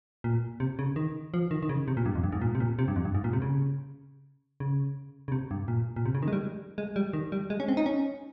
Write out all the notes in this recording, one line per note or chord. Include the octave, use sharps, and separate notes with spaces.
A#2
C3
C#3
D#3
F3
D#3
D#3
C#3
C3
A#2
G2
F2
G2
G#2
A#2
C3
A#2
C3
G2
F2
G2
G#2
A#2
C3
C#3
C#3
C#3
C3
G2
A#2
A#2
C3
C#3
D#3
G#3
G3
G#3
G3
D#3
G3
G#3
C#4
C4
D#4
C#4